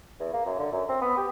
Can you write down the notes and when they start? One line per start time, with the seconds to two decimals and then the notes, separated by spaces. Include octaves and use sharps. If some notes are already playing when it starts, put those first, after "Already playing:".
0.19 E2
0.33 A#3
0.46 F#2
0.59 D3
0.72 F#2
0.89 C4
1.01 B3
1.17 G4